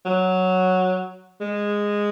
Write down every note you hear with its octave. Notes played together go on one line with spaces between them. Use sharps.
F#3
G#3